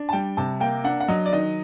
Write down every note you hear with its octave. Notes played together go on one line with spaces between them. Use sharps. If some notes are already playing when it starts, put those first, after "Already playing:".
Already playing: D4
A5
G3 G5
C3 A5
A#3 G5
D4 F#5
F#5
F#3 D#5
D5
D#3 D#5